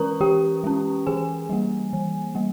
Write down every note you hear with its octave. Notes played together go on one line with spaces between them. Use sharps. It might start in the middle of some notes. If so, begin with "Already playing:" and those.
Already playing: E3 G#3 C#4 A#4 B4 A#5 C#6 D#6
E3 G4 G5
G#3 C#4
E3 G#4 G#5
G3 A#3
E3
G3 A#3